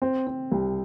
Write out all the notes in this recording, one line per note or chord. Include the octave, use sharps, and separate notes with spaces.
C4
C4
C2